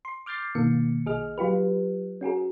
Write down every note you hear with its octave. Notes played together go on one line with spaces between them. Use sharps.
C6
D6 F6 G6 A6 C7
G1 B2 D#3 A#3 C#7
B1 G#4 D#5 F6
F#3 F4 G4 B4
C#4 F#4 G#4 A#4